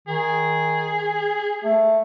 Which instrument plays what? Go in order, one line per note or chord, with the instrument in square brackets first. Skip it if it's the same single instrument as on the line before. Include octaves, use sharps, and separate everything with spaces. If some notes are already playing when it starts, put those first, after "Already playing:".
[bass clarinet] D#3 [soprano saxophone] G#4
[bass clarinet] A3